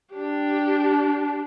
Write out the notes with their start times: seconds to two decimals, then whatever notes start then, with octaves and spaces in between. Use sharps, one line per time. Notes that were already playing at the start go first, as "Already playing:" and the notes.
0.13 D4 G4